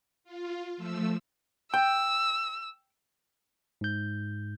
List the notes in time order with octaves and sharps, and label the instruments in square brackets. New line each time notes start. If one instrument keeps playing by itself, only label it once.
[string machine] F4
F3 A3 E6
[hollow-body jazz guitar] G5 [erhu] E6
[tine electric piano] G#2 G6